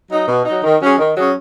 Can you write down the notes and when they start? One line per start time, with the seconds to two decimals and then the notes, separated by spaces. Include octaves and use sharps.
0.10 F#3 D#4
0.28 B2
0.45 F#3 D#4
0.63 D#3
0.81 F#3 C#4 G#4
0.99 D#3
1.16 F#3 C#4 G#4